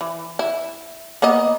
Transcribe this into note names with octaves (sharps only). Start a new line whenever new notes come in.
E3
E4
A#3 B3 D#5